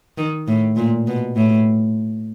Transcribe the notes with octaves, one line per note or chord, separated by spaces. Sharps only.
D#3
A2
A#2
B2
A2